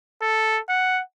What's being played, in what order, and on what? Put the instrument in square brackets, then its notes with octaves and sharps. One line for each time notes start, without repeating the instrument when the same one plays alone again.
[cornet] A4
F#5